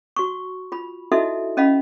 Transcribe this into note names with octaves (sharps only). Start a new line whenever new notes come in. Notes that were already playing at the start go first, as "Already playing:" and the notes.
F#4 C#6
F4 B5
D#4 E4 F#4 A4 D#5 E5
C#4 D#5 F5 B5